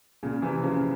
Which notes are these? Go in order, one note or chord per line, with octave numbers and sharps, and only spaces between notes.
A#2 C#3
C3 E3
C#3 F3